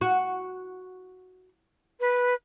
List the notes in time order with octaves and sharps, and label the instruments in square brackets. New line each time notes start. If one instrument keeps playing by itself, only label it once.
[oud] F#4
[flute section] B4